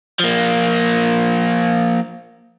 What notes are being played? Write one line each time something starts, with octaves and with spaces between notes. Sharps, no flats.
F3 A#3